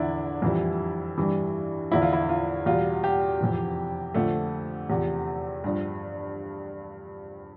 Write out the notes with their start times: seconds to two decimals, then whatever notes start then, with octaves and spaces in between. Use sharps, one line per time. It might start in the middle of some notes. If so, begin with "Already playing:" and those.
Already playing: E2 D3 F3 D4 E4
0.42 F2 E3 G3
1.18 G2 E3 G3
1.91 E2 D3 F3 E4
2.02 F4
2.13 E4
2.29 F4
2.66 E2 B2 G3 F4
3.04 G4
3.41 F2 C3 E3
4.14 F2 D3 F3 A3
4.90 E2 C3 F3
5.64 G2 F3